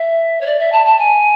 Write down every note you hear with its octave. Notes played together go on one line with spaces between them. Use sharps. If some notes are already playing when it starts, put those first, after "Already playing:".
Already playing: E5
C#5
D5
E5
A5
A5
G#5